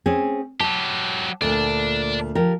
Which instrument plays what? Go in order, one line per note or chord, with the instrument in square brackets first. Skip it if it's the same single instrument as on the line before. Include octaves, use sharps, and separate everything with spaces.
[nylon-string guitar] C4 C#4 G#4
[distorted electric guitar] F#3 G4 [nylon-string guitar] A5
[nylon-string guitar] D2 A#2 [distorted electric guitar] D5 A5
[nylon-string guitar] F3 G4 A#4